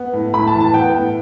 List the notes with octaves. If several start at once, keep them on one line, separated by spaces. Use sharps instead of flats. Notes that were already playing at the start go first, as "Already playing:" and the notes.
Already playing: B3
A2
A2 B5
A5
E3
A5
B3 G5
A2